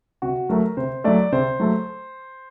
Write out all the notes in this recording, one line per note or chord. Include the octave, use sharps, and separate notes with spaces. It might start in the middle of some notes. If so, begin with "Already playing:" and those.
C3 F#4
F#3 A3 A#4
C3 C5
F#3 A3 D5
C3 C5
F#3 A3